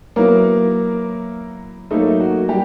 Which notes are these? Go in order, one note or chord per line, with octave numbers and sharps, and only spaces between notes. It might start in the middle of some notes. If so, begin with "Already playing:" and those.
F#3 A#3 B3 E4 A#4
F#3 A3 A#3 D#4 A4
F#4
G3 G4